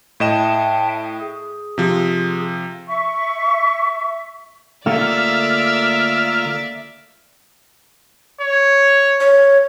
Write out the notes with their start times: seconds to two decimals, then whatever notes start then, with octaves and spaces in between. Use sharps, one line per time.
0.20 A2 D#5 E5 G5 A5 E7
1.20 G#4
1.78 C3 F3
2.87 E5 C#6
4.86 D3 A3 A#3 F4 D5 E5 E6 F6
8.41 C#5
9.20 C#5